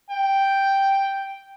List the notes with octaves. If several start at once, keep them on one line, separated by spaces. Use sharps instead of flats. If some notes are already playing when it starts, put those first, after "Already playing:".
G5